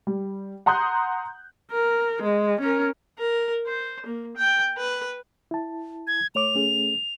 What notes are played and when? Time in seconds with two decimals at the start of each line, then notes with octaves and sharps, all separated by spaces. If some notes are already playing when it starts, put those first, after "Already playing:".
0.07 G3
0.66 F#5 A#5 C6 D#6 F#6 G6
1.72 A#4
2.23 G#3
2.61 C#4 A#4
3.18 A#4
3.67 C5
4.06 A#3
4.37 G5
4.78 B4
5.51 E4 A5
6.07 G#6
6.35 A3 C#5 D6 F7
6.55 A3 C#4 G#4